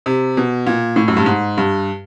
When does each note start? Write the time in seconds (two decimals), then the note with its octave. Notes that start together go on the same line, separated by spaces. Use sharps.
0.06 C3
0.37 B2
0.67 A#2
0.96 A2
1.08 F#2
1.17 G2
1.26 G#2
1.58 G2